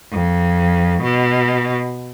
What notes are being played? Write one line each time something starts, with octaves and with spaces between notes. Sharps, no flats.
F2
B2